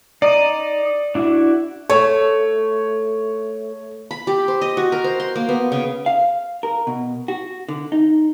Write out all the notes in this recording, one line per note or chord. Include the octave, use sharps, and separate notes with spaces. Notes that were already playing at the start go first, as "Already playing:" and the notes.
D#4 D5 D#5
D4 E4 F#4
A3 C#5
B5
G4
C5
D#5
F#4
A#4
C5
C6
A#3
B3
C#3
F5
A#4
B2
F#4
D3
D#4